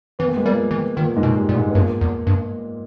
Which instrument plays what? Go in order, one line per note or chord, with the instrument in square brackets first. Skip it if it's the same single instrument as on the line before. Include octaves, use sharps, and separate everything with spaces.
[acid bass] E3 [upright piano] B3
[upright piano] A#3
G#3
[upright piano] A#2 A#3 [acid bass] G3
[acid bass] E3
[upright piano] A#2 A#3 [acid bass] D#3
[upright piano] G#2 G#3
[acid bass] B2
[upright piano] G3
[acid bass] A#2
[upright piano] G#2 G#3
B3
[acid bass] G2 [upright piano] A#2 A#3
[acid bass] E2
G2